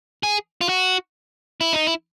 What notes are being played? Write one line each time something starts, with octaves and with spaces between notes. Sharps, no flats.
G#4
F4
F#4
E4
D#4
E4